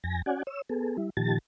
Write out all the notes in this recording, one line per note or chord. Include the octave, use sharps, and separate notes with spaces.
F2 G#5 A#6
C#4 F#4 D5 F#5 G#5
C#5 E6
B3 G#4 A4
G3 E4
A#2 D#3 F3 G4 A5 A6